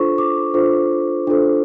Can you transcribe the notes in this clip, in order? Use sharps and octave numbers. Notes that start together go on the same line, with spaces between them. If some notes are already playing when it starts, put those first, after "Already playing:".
Already playing: D4 F4 A4 C5 C#6
D6
D4 F4 A4 C5
D4 F4 A4 C5